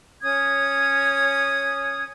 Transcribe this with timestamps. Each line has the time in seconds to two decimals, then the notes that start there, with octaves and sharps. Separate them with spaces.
0.22 C#4 C#5 D#6 G#6